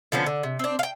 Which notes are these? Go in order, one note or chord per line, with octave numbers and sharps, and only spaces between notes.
D3 F3 B3 C#4
D3
C3
C4 D4
F5 G5